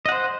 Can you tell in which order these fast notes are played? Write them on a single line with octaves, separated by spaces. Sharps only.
D#5 F#5 C5